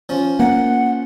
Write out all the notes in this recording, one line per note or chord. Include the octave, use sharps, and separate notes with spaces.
F3 C#4
A#3 F#5